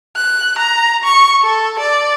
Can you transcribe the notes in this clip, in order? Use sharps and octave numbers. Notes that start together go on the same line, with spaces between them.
F#6
A#5
C#6
A4
D5